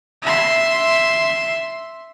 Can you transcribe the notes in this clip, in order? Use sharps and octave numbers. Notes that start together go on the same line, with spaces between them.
E5 C6